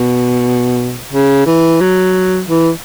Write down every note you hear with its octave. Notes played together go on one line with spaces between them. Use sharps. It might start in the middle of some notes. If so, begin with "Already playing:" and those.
Already playing: B2
C#3
E3
F#3
E3